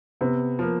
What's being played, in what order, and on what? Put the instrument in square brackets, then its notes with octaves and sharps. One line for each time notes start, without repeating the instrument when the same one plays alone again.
[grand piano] C3 [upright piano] B3
[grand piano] F3 A#3